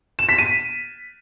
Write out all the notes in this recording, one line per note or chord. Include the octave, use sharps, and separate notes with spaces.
E7
B6
D#7